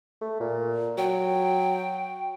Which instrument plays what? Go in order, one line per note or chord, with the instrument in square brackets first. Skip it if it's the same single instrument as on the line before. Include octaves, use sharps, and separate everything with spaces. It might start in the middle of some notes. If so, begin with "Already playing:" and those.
[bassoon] A3
A#2
[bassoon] F#3 [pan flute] G5